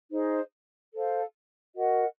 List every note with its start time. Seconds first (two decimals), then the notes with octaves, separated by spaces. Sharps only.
0.10 D#4 G#4 C5 D#5
0.93 A4 C5 F5
1.75 F#4 A#4 D#5 F#5